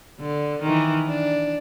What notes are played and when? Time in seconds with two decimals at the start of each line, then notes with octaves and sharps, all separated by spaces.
0.20 D3
0.63 D#3 E3
1.08 D4